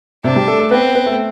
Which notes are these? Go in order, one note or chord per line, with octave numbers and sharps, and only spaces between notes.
C3 C4 D4
G3 G4
A3 A4
A3 A4
B3 C4 B4
B3 B4
A3 A4